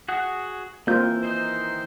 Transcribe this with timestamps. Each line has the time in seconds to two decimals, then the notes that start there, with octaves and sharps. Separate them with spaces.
0.08 F#4 G#4 F#5
0.87 E3 A#3 C4 F4 G6
1.23 D#3 D#4 C5